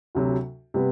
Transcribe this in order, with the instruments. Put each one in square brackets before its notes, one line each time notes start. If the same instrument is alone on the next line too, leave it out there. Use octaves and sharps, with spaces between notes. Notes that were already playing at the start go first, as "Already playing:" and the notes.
[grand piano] D2 C3 F#3
C3 G3 B3